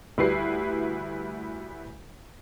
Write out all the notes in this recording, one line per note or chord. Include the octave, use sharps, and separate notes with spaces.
D2 G3 E4 F#4 B4 C7